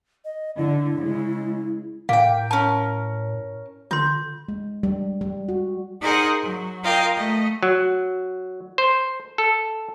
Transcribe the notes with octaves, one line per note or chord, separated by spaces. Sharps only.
D#5
D3 E4
C#3 G#3
A2 A#3 F5 G5
C#4 A#4 A5
D3 F4 C6 G6
G#3
G3
G3
F#4
D#4 G#4 A#4 C5 F#5 G#5
F#3
F4 A#4 D#5 F5 G5
A3 D#5
F#3
C5
A4